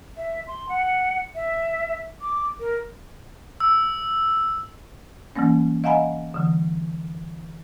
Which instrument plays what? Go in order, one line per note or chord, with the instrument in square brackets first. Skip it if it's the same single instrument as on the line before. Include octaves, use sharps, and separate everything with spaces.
[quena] E5
C6
F#5
E5
D6
A#4
[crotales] E6
[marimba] E3 G3 A3 A#3 C#4
D#5 F5 F#5 G#5 A#5 B5
D3 E3 G3